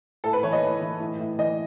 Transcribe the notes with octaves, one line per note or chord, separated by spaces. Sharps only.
A2 A4
B4
E3 C#5
D#5
E3
E3
A2
A2
E3 D#5